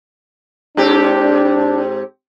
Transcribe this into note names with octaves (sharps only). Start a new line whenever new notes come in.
G#2 C4 D4 G4